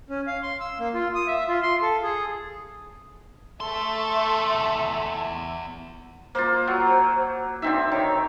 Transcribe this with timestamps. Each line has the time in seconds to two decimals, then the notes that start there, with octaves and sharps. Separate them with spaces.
0.10 C#4
0.27 F5
0.42 C6
0.60 E6
0.80 A#3
0.94 F4
1.15 D#6
1.28 E5
1.48 F4
1.63 C6
1.82 A4
2.03 G#4
3.60 E2 A3 A4 E5 C6
6.35 A#3 F4 C5
6.67 F#3
7.62 D3 C4 D#4 E5
7.92 D#3 C#5